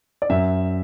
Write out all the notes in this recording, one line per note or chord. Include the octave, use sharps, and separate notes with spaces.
D5
F#2 E5